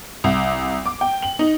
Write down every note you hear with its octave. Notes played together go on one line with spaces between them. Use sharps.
C2
D6
G5
F#7
D#4